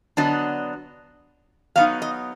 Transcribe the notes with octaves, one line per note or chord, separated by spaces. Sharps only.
D3 F#3 B3 D4 D#5
F#3 B3 D#4 F5
D#5